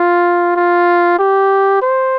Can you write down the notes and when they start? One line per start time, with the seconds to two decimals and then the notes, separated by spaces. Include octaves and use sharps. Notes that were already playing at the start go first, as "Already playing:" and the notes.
Already playing: F4
0.56 F4
1.19 G4
1.82 C5